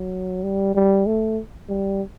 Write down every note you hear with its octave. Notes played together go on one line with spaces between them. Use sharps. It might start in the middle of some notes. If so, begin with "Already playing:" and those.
Already playing: F#3
G3
G3
A3
G3